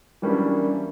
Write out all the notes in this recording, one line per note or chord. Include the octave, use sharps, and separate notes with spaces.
E3 F#3 G3 A#3 C#4 D4